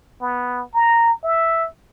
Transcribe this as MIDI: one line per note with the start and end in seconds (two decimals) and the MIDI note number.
0.22 0.64 59
0.74 1.13 82
1.24 1.68 76